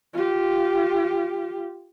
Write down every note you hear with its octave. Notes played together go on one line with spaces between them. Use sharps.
F4 G4